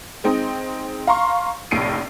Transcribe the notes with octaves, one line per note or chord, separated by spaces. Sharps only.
G#3 C4 D#4
F5 A#5 C6 C#6
F1 A#1 A2 C7 D7 D#7